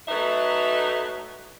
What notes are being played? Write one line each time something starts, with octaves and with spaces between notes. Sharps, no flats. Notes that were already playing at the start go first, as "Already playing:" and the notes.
F#3 A3 D#4 B4 E5